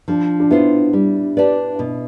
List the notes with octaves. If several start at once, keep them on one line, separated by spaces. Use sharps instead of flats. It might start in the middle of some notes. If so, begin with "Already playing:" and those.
F3 D4
D4
B3 E4 F4 C5
G3
D4 G4 B4 D5
B2